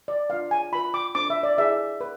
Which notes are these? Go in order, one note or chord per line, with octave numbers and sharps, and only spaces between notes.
D5
D4 F4 B4 F5
G#5
F4 B4 B5
D6
D4 A4 C5 D6
E5
D5
E4 G#4 B4 E5
B4